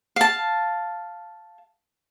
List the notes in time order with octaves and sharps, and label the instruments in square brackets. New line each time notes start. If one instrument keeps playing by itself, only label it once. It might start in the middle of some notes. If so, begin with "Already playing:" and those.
[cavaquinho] F5 A5